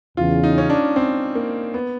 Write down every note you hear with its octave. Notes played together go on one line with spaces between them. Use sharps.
E2 C#3 E3 F4
D#4
C#4
D4
C4
A#3
B3